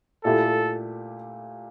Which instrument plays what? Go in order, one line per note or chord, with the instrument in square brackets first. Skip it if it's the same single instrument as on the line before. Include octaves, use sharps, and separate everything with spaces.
[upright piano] A#2 A3 E4 G4 [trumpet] A4